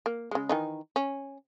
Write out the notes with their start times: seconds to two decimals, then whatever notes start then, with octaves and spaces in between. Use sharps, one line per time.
0.06 A#3
0.31 C#3 G#3
0.49 D#3 E3 D#4
0.96 C#4